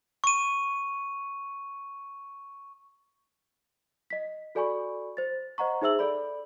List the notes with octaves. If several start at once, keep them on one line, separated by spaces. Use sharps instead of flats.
C#6 D#7
D#5 B6
F#4 A4 D5 G#5 B5 C#6
C5 A6
C5 D#5 F#5 A#5 C#6
D#4 G#4 C5 E5 E6 F#7
A4 D5 B5